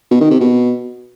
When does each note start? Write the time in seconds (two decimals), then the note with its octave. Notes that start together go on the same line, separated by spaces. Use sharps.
0.11 B2
0.21 D#3
0.31 C3
0.40 B2